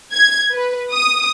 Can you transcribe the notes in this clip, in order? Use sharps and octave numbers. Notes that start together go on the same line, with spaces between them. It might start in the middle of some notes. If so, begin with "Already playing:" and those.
G#6
B4
D#6